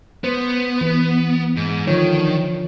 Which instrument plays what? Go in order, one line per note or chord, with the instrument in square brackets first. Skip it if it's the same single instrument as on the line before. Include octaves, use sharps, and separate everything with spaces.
[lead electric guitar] B3 [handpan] C5
[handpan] E3
[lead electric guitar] G#2
[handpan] D3 F3 C#5 [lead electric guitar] D#3